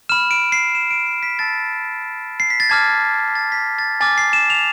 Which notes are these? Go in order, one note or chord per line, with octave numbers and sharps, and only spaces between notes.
B5 F6 E7
D7
C7
E7
D7
C7
B6
A5 E6 A6
C7
B6
A6
A5 D6 F6 G#6
G#6
B6
A6
B6
A6
A6
G#5 D6 F6 A6
C7
E7
F7